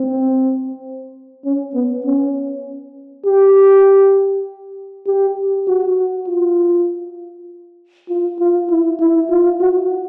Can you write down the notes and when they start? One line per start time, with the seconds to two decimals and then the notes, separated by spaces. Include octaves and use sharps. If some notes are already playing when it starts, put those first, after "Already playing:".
Already playing: C4
1.45 C#4
1.75 B3
2.05 C#4
3.26 G4
5.07 G4
5.67 F#4
6.28 F4
8.09 F4
8.40 F4
8.70 E4
9.00 E4
9.30 F4
9.61 F#4